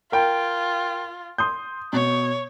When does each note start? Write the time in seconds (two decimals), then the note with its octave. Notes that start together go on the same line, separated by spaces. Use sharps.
0.12 F4 A#4 G5
1.38 C6 D#6 G6
1.93 B2 C#5